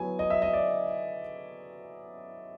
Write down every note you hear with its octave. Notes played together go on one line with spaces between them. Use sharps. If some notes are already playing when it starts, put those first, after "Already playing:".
Already playing: F#3 B3 E4 G#5
D#5
E5
D#5
D5